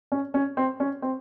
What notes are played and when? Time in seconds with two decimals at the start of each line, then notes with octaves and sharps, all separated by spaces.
0.12 C#4
0.34 C#4
0.57 C4
0.80 C#4
1.02 C4